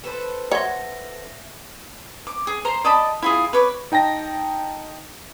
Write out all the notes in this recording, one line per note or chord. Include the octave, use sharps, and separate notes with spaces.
A4 B4 C5
C#5 E5 F#5 C6 A#6
D6
G#4
C5 A#5 C6
D5 D#5 A5 B5
E4 F4 G#4
B4 C#5 D6
D#4 G5 A5 A#6